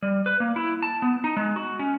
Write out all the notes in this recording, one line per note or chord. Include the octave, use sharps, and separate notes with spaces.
G3
B4
A#3
E4
A5
B3
D#4
G#3
F#4
C#4